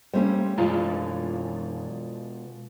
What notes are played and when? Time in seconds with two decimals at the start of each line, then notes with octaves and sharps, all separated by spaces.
0.13 G3 A3 A#3 C#4 C5
0.58 F#2 B2 E3 F3 G#3 F4 G#4 A#5